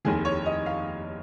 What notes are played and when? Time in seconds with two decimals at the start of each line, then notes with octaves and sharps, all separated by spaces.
0.05 F1 D#2 D#3 G#4
0.25 C#5
0.46 D#5
0.66 F5